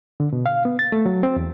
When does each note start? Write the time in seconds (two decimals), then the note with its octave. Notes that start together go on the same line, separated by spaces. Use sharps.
0.20 D3
0.33 B2
0.46 F5
0.65 B3
0.79 A6
0.92 A3
1.06 F#3
1.23 C4
1.36 E2